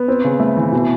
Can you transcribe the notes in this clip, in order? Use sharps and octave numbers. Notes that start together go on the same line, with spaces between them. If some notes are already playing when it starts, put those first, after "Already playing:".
Already playing: B3
C4
C#3
A3
E3
B2